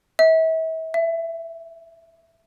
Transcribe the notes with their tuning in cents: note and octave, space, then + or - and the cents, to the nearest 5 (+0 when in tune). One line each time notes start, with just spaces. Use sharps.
E5 -40
E5 +10